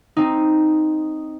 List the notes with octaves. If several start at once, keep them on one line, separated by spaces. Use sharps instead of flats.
C4 D#4